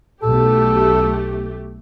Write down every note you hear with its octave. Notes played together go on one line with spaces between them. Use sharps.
B1 A3 G4 A4